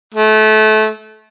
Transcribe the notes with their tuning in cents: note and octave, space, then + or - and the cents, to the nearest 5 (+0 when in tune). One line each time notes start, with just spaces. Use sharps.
A3 -25